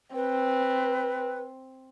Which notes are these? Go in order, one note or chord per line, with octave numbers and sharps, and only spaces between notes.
C4 B4